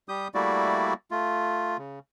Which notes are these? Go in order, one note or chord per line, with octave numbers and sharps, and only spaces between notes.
G3 G4 D#6 G6
G3 A3 A#3 E4 F#4 D5
A3 F4
C#3